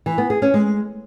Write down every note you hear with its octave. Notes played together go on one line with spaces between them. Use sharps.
E3
B3
G#4
C#4
G#3